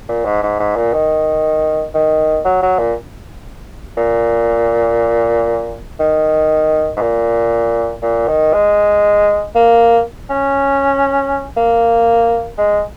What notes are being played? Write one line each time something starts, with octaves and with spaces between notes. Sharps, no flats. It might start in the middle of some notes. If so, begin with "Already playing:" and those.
A#2
G#2
G#2
G#2
A#2
D#3
D#3
F#3
F#3
A#2
A#2
D#3
G#2
A#2
A#2
D#3
G#3
A#3
C#4
A#3
G#3